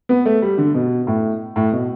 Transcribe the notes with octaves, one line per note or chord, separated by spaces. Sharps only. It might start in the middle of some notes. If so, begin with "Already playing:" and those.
B3
A3
G3
D3
B2
A2
A2
B2